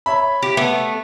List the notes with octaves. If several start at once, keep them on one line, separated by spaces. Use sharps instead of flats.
C#5 E5 B5
G4
A3 B3